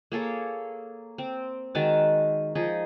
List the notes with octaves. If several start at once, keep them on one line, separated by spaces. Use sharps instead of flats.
A#3 G#4 A4 C#5
C4
D#3 G#3 F#4 A5
F3 D#4 G#4